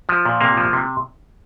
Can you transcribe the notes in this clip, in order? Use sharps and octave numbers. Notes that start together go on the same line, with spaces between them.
F3
A#2
C3 A#3
F3
C3